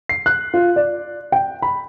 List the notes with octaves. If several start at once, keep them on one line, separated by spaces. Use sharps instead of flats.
C7
F#6
F4
D5
G5
B5